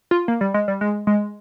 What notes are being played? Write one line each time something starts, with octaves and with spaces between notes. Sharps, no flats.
F4
A#3
G3
G#3
G3
G#3
G#3